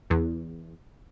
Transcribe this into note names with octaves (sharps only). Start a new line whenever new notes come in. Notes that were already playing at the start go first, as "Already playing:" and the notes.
E2